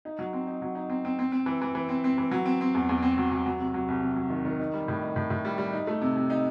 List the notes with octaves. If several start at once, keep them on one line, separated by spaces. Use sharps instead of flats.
D#4
F#3
C4
D#4
F#3
D#4
C4
C4
C4
C4
E3
E3
E3
C4
C4
E3
F#3
C4
C4
E2
E2
C4
F#3
F#3
F#3
C3
F#3
C2
C3
F#3
D#3
D#3
D#4
G3
A2
D#4
A2
A2
G3
G3
D#4
A3
C3
C3
D#4